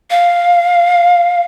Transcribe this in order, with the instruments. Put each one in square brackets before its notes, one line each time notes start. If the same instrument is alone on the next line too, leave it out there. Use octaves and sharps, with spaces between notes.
[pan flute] F5